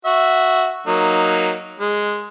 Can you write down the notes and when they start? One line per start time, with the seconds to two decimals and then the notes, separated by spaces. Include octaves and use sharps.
0.05 F#4 E5
0.86 F#3 A#3 D#4
1.80 G#3